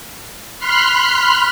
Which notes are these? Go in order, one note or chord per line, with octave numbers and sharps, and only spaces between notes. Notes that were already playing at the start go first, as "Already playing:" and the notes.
B5 C6 F6 F#6 C7